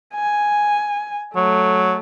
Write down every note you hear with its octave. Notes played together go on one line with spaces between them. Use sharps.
G#5
F#3 A3